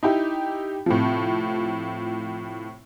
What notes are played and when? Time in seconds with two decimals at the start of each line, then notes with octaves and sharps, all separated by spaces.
0.03 D#4 E4 G4
0.86 A2 C3 F3